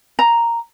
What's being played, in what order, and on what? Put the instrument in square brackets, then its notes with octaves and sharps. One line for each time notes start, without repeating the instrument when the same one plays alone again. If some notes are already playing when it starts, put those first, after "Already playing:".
[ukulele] A#5